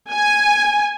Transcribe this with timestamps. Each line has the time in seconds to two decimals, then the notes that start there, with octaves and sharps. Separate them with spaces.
0.12 G#5